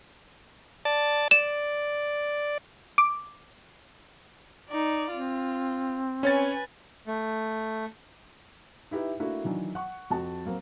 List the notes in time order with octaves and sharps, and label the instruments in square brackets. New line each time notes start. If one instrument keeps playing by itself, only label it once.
[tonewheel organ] D5 A5
[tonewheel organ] D5 [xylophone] E7
[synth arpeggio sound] D6
[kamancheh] D#4 D5
[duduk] C4 [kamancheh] F4
[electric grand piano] C#4 C#5 A6 [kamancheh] B4 G#5
[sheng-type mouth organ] A3
[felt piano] D#4 E4 G4 B4 E5
A3 A#3 D4 E4 F#4
D#3 E3 F#3 D4
F#5 C#6
F2 F#4 A5
F#3 A#3 C4